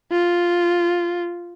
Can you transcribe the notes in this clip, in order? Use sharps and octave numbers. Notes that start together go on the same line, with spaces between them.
F4